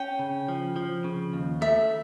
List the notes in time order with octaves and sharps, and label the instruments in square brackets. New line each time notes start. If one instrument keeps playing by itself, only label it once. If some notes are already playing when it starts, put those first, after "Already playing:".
Already playing: [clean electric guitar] C#4 [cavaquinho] G5
[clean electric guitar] C#3
F3
F3
C#3
D#2
[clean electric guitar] A3 [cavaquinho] E5